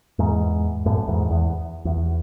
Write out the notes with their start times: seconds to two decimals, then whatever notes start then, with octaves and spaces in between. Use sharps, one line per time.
0.19 E2 G#2
0.86 F#2 A2
1.08 E2 G#2
1.30 E2
1.85 E2